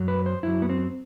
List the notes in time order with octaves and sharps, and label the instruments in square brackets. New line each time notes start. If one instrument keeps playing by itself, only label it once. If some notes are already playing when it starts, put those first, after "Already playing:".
Already playing: [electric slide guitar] F#2 F#3
B4
C5
F#2 F#3 E4
B3
C4